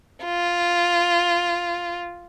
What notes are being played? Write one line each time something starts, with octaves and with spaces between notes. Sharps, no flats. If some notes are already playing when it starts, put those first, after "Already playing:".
F4